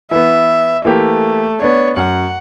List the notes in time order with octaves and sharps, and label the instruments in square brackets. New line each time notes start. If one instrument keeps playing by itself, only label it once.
[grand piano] E3 B3 [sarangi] E5
[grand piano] E3 A#3 G4 [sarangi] A3
[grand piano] B3 D4 [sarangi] C#5
[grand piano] F#2 [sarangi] F#5